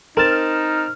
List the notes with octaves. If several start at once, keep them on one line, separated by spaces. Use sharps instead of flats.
C4 D#4 A#4 A5 F6